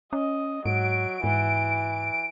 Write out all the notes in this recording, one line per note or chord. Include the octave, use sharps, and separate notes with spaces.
C#4 D#5
G#2 F#3 D7
G#2 E3